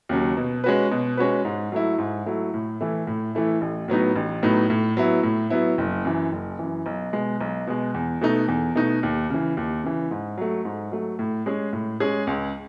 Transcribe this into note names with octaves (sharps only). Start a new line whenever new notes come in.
D#2 C#3 F#3
B2
G#3 C#4 F#4 B4
B2
G#3 C#4 F#4 B4
G#2
F#3 A3 E4
G#2
F#3 A3 E4
A2
E3 A3 E4
A2
E3 A3 E4
A1
A2 F#3 B3 D#4
A1
A2 F#3 B3 D#4
A2
F#3 B3 E4
A2
F#3 B3 E4
F#1
F#2 E3
F#1
F#2 E3
B1
B2 G#3
B1
B2 G#3
E2
B2 A3 D#4
E2
B2 A3 D#4
D#2
C#3 E3
D#2
C#3 E3
G#2
F#3 A3
G#2
F#3 A3
A2
G#3 C#4 G#4
A2
G#3 C#4 G#4
C#2